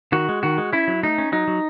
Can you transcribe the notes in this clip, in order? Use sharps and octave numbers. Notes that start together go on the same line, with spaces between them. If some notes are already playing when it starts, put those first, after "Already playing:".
D#3 F#4
G#3
D#3 F#4
G#3
C#4 E4
F#3
A3 D#4
C#4
F#3 D#4
F#3